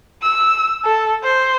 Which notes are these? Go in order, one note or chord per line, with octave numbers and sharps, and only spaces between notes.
E6
A4
C5